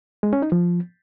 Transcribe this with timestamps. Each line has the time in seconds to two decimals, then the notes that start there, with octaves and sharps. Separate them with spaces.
0.23 G#3
0.33 C#4
0.42 D#4
0.52 F3